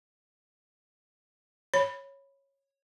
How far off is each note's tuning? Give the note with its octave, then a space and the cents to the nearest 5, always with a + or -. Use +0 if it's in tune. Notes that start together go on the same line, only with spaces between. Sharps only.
C#5 -10 B5 +0